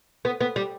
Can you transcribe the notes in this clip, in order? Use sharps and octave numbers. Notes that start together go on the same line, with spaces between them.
B3
B3
G3